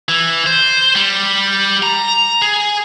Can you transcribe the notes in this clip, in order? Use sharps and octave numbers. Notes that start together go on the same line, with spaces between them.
E3
C5
G3
A#5
G#4